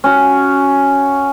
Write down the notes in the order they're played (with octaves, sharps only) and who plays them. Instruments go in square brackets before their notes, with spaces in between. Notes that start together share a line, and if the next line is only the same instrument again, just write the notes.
[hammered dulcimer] C#4 F#4